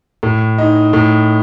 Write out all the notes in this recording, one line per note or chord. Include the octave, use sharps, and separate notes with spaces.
A2
D#4
A2